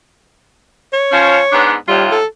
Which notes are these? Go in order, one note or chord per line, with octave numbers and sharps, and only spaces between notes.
C#5
F3 C#4
G#2 B3 D4
D#2 A2 G3 F4
A4